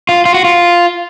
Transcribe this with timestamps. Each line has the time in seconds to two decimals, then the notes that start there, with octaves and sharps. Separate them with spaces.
0.09 F4
0.25 F4
0.34 F#4
0.44 F4